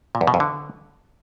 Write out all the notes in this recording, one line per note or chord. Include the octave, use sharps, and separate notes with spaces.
A#2
E2
B2
F2
D3